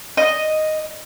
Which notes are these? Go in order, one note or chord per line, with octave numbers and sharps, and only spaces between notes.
D#5